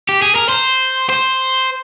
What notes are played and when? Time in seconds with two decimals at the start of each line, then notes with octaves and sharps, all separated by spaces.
0.09 G4
0.22 G#4
0.36 A#4
0.49 C5
1.10 C5